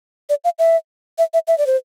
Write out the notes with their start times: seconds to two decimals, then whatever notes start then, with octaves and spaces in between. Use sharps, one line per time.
0.29 D5
0.44 F5
0.59 E5
1.18 E5
1.33 E5
1.48 E5
1.58 D5
1.67 C5